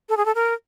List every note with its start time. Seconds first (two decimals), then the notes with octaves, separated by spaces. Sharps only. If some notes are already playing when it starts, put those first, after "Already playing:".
0.09 A4
0.17 G#4
0.26 A4
0.35 A#4